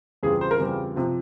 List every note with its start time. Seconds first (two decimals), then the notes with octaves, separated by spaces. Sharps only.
0.23 E2 C#3 G3 C4 F4 G#4
0.41 C5
0.51 A#4
0.60 E2 C#3 G3 C4 F4
0.96 C3 F3